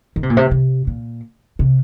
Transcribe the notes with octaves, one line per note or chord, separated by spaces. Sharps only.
D#3
C3
A#2
C3
C3
A#2
C3